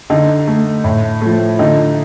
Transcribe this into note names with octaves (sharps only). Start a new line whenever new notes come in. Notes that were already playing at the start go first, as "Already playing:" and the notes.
D3 D#4
A3
A2
F3 A3
D3 D#4